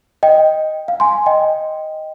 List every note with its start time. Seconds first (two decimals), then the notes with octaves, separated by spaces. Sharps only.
0.23 D#5 G5
0.88 F5
1.00 G#5 C6
1.26 D#5 G5